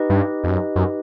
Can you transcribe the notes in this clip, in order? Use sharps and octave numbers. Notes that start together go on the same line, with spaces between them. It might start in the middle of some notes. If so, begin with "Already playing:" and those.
Already playing: D#4 G4 B4 D#5
G2
F2
F#2
F#2